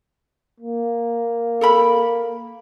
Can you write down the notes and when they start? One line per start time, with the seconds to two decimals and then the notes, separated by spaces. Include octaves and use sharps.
0.60 A#3
1.61 A4 A#4 B5